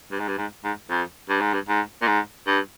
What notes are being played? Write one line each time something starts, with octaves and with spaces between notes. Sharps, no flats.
G2
G#2
G2
G#2
G#2
F2
G2
G#2
G2
G#2
A#2
G#2
G2